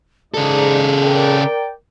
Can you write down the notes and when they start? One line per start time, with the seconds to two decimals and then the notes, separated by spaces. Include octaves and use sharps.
0.34 G#2 C#3 D#4 G#4 A4 D5
1.03 A#4 D5 G5